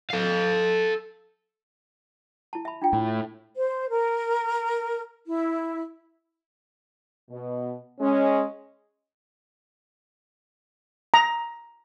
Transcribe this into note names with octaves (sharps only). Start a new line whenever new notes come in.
A4 F5
E4 A5
E5 B5
D4 F4 G5
A2
C5
A#4
E4
B2
G#3 C#4
A#5